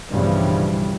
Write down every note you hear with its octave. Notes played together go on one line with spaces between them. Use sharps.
B1 G2 C#3 E3 F3 G3